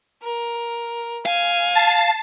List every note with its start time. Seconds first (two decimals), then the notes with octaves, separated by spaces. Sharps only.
0.22 A#4
1.26 F5 G#5
1.75 A5 A6 C7